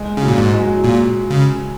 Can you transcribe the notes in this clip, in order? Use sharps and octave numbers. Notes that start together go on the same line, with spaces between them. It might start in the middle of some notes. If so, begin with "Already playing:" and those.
Already playing: G#3
C#3
F#3
A#2
G#2
G#3
F#3
F#3
A#2
C#3